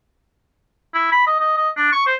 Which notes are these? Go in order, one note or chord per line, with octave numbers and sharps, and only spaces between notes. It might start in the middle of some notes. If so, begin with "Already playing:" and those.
E4
B5
D#5
D#5
D#5
D4
C#6
C5